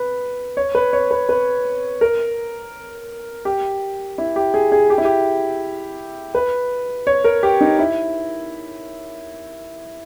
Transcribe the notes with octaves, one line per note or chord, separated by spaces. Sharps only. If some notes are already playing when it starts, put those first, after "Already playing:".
Already playing: B4
C#5
B4
C#5
B4
B4
A#4
G4
E4
G4
G#4
G#4
G4
E4
G4
B4
C#5
A#4
G4
D#4
E4